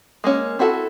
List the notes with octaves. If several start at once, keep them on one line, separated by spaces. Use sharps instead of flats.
G#3 A#3 C#4
C4 E4 F#4 G#4 A4